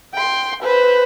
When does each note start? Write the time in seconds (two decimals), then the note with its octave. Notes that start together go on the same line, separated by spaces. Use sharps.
0.14 G5 C6
0.63 B4 C5